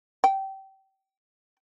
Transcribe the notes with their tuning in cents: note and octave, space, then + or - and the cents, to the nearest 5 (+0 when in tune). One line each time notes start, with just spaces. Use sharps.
G5 -25